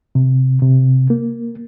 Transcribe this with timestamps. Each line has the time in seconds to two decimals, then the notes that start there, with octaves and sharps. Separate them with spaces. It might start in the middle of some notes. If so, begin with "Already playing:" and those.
0.15 C3
0.62 C3
1.10 A#3